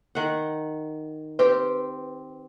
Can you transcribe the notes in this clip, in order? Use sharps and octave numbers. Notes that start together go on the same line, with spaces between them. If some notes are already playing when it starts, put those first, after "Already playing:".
D#3 F#5
C4 G4 B4